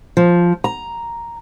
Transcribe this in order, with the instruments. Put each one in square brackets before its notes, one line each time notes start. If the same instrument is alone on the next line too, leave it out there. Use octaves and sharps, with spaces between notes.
[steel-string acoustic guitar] F3
A#5